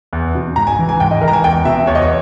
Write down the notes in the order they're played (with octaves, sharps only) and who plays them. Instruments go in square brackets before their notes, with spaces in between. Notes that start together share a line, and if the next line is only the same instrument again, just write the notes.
[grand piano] E2
B2
G#2 A#5
G#5
E3
G#5
G#2 G5
D#5
E3 A#4
A#5
G#5
E2 G5
B2 E5
E2 C#5
D#5
C#5